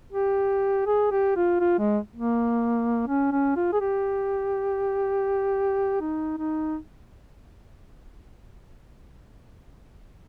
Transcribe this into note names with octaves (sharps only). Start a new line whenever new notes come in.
G4
G#4
G4
F4
F4
G#3
A#3
C#4
C#4
F4
G#4
G4
D#4
D#4